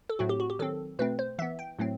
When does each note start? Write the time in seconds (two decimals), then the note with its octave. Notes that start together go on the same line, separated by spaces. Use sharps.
0.10 A4
0.19 A2 F#3 A3 C4 F#4
0.29 G4
0.40 F#4
0.50 G4
0.59 D#3 F#3 C4 A4
0.99 B2 A3 C4 B4
1.19 C5
1.39 E3 B3 E5
1.59 G5
1.79 A2 F#3 A3 C4